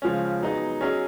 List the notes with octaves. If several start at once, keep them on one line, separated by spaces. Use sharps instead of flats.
C#3 F3 G#3 C#4
F#3 B3 D#4 G#4 D#5
F#3 C#4 G#4 D#5